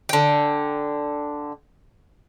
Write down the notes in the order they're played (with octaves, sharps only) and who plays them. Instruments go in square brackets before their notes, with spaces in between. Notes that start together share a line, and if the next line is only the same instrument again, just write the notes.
[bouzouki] D3 G5